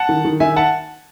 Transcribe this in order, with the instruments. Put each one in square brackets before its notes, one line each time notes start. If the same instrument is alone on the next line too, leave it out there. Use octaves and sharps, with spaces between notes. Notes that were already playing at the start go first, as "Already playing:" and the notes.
Already playing: [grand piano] F#5 A5
D#3
D#3
D#3 E5 G#5
F#5 A5